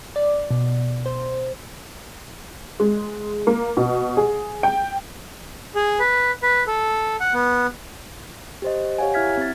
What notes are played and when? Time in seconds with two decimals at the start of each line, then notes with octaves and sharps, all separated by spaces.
0.16 D5
0.51 B2
1.06 C5
2.80 G#3
3.47 A#3
3.77 B2
4.17 G#4
4.63 G5
5.75 G#4
6.00 B4
6.42 B4
6.67 A4
7.20 F#5
7.33 B3
8.62 G4 C5 D#5
8.98 G4 C#5 F5 F#5 G#5
9.14 E4 E5 F6 G#6 B6
9.37 C4 A6